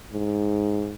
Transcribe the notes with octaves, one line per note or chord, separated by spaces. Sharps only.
G#2